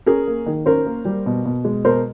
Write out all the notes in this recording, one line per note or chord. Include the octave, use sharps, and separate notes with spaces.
C#4 G#4 A#4
A#3
D#3
C#4 A#4 C5
A#3
G3
B2
B2
G#3
B2 A#4 C5